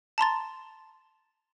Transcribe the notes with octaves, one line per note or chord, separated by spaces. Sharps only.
A5 A#5 C6 A6